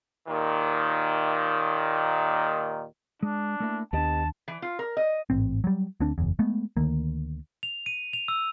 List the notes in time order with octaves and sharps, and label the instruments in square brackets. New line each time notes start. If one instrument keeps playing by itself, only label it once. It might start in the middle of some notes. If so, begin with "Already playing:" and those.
[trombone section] D#2 A#2 D#3
[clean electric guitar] G#3 [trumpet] D4
[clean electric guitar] A3 A#3 E4
[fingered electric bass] D#2 D4 [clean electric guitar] B3 G4 D#5 [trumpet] A5
[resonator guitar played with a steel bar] E3
F4
A#4
D#5
[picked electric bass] A1 G#2 C4
F#3 G3
D2 C4 D4
F#1 E2
G#3 A3 B3
D2 D#3 A#3
[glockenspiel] F7
D#7
F7
E6